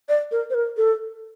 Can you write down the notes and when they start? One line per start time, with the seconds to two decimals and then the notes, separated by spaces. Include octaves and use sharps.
0.09 D5
0.31 A#4
0.50 C5
0.54 A#4
0.77 A4